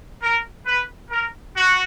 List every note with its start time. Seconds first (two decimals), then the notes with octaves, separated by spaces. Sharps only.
0.23 A#4
0.66 B4
1.11 A#4
1.56 F#4